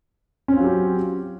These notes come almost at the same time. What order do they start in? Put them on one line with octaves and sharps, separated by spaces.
C#4 C4 F4 F#3 G4